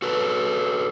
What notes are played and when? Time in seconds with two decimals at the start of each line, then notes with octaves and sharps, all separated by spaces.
0.02 F#4 A4 B4